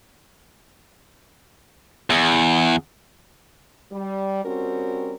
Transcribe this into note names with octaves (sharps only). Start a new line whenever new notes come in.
E2
G3
G3 C4 C#4 F#4 A#4